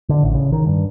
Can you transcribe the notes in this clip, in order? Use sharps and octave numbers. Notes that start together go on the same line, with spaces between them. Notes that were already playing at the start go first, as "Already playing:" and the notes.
D3
A1
C#3
D#3
G2